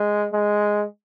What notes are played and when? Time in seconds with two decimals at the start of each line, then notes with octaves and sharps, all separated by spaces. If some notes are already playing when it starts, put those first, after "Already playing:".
Already playing: G#3
0.32 G#3